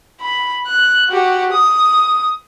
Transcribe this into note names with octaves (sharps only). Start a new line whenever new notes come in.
B5
F#6
F#4 G4
D#6